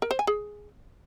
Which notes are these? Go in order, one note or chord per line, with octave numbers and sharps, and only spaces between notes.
A#4
C5
G#5
G#4